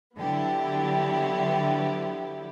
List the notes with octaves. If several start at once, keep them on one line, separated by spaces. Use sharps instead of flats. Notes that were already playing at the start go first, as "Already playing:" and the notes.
D3 F#3 B3 E4 G4